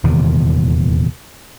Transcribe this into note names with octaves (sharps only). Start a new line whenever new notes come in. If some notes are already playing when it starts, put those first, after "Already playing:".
D#1 E2 C3 D#3